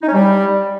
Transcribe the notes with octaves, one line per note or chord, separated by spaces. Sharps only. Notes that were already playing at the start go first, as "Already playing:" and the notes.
D#4
C#4
G3